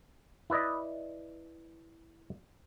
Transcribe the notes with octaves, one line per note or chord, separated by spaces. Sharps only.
E4 B4 D5 D#5